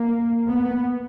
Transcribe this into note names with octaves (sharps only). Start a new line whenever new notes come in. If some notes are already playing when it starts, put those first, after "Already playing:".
Already playing: A#3
B3